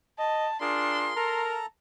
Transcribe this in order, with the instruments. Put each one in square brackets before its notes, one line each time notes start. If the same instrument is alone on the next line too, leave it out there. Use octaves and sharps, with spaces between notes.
[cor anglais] D#5 [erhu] A5
[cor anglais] D4 [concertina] F4 G#4 A#4 [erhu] C6
[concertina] A4 A5 A#5 [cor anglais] A#4